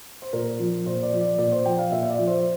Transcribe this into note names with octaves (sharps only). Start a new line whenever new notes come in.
C5
A#2 A#4
F3
A#2 C5
D5
F3
D5
A#2 D5
C5
F3 G5
F5
A#2 E5
E5
D5
F3
C5